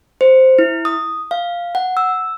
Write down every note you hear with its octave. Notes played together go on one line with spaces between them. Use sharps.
C5
E4
D#6
F5
F#5
E6